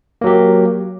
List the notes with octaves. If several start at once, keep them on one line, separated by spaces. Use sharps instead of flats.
F#3 A#3 G4